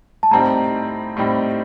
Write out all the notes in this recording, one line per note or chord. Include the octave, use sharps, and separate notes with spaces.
A5
A2 G3 C4 D#4 A#5
A2 G3 C4 D#4